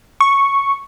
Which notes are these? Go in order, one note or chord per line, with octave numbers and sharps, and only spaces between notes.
C#6